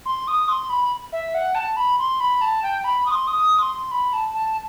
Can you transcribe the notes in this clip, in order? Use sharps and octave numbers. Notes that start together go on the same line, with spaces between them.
C6
D#6
C6
B5
E5
F#5
A5
B5
C6
B5
A5
G5
B5
D#6
C6
D#6
C6
B5
A5
A5